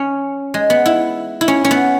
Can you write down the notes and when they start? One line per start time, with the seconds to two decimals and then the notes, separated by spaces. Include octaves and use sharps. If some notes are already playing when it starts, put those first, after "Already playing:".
Already playing: C#4
0.54 G#3
0.70 B3
0.86 E4
1.41 E4
1.48 C#4
1.64 C#4
1.71 B3